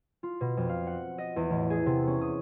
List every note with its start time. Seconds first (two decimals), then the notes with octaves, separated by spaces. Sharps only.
0.23 F4
0.41 B2
0.57 F2
0.69 F5
0.87 F#5
1.18 D#5
1.36 E2
1.50 A1
1.70 G#4
1.86 C3
2.07 C#4
2.21 D#6